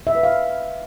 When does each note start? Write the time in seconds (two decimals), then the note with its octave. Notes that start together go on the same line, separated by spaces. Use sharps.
0.07 E5
0.15 B4
0.23 F5